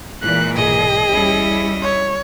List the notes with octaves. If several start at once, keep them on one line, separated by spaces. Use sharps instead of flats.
A#2 E3 G#3 F#6
B1 G#2 B2 G#4 D#5
A1 D2 G3 C#4 E4
C#5